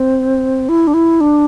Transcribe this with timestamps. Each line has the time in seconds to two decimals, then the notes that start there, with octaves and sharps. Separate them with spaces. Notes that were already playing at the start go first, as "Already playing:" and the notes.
Already playing: C4
0.69 E4
0.87 D4
0.94 E4
1.21 D4